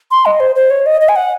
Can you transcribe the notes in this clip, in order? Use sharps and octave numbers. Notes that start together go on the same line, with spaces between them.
C6
D#5
C5
C5
C#5
D#5
D#5
G#5
F#5